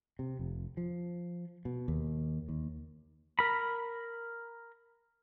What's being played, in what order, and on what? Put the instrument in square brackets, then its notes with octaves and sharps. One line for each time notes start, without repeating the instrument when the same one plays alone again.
[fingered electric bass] C3
F1
F3
B2
D#2
D#2
[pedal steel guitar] A#4 B5